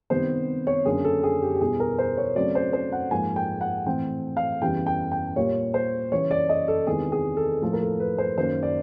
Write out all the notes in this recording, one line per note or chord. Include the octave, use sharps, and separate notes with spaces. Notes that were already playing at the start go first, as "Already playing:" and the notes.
C3 D#3 G3 B3 C5
C#5
F#2 D3 F#3 A#3 G#4
A4
G#4
G4
G4
E2 B2 G3 G#4
A#4
C5
C#5
C#3 F#3 A3 C4 D5
C5
C5
F#5
G#2 F3 A#3 G#5
G5
F#5
A2 E3 A3 C4 G5
F5
E2 C#3 E3 G3 G5
G5
G5
A#2 G3 A#3 C#5
C5
C#3 E3 G3 C#5
D5
D#5
A4
E2 C3 D#3 G#3 B3 G#4
G#4
A4
A2 F3 A#3 A4
A#4
A4
B4
C5
F#2 D#3 F#3 A#3 C5
D5